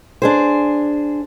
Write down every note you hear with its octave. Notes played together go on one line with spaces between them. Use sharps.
D4 G#4 C5